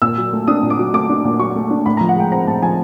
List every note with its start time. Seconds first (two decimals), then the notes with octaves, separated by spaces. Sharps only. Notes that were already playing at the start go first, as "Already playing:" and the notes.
0.02 A#2 E6
0.17 F#3
0.33 A3
0.47 D4 D#6
0.63 A#2
0.70 D6
0.79 F#3
0.94 A3 D6
1.09 D4
1.24 A#2
1.39 F#3 C#6
1.55 A3
1.71 D4
1.86 A2 B5
1.97 F3 A#5
2.09 F#5
2.16 G#3 G5
2.32 C4 A#5
2.47 A2 A5
2.62 F3 G#5